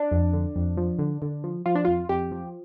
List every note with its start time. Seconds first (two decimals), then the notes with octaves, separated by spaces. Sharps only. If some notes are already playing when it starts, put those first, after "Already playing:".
Already playing: D4
0.11 F2
0.33 D3
0.56 F2
0.77 F3
0.99 D3
1.22 D3
1.44 F3
1.66 F3 F4
1.75 D4
1.85 F2 F4
2.09 F2 G4
2.32 F3